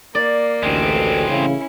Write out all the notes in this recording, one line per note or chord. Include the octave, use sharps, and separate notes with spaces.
A#3 D5
A1 D2 G#3 C4
A1 C#3 C#4 E4